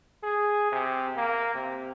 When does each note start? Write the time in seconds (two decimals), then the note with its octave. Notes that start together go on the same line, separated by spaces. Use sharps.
0.23 G#4
0.72 C3
1.16 A#3
1.55 C3